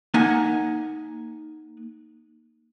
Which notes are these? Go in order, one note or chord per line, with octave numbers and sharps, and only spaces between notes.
A#3 D#4 F#5 G#5